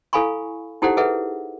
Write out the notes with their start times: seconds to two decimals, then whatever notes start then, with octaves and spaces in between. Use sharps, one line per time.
0.13 E4 A4 F5 G#5 B5 C#6
0.82 D#4 E4 G4 A4 C5 F#5
0.97 G#4 A4 B4 E5 F#5